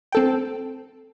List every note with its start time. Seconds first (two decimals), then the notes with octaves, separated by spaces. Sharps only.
0.12 C4 A4 G5